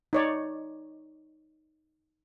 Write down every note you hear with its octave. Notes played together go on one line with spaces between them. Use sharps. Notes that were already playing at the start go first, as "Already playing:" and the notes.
D#4 C#5 D5